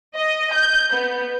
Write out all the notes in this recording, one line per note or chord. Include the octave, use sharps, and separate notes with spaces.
D#5
G6
B3